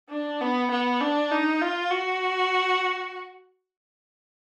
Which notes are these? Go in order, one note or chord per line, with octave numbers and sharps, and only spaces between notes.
D4
B3
B3
D4
D#4
F4
F#4